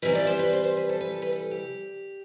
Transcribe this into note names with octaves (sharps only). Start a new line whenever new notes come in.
C3 E3 G3 B4
D5
C5
B4
C5
C5
B4
A4
B4
A4
B4
A4
G4